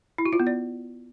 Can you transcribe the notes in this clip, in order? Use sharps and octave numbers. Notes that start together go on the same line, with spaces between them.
E4
F#4
F4
B3
D5